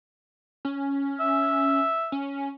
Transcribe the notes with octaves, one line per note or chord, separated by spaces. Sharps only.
C#4
E5
C#4